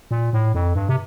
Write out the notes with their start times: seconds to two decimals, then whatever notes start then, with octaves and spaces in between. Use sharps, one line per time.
0.11 A#2
0.33 A2
0.54 F2
0.75 G2
0.89 C3